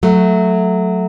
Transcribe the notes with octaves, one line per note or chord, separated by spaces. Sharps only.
F#3 A3